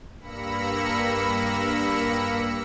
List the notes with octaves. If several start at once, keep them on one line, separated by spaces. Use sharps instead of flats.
G2 A#3 B5 E6 A#6 C#7